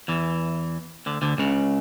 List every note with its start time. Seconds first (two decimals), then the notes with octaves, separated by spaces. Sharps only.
0.08 E2 E3
1.06 D2 D3
1.22 D2 D3
1.38 C#2 C#3